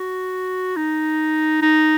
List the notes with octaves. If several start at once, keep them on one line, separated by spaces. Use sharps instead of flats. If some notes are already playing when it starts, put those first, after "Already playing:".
Already playing: F#4
D#4
D#4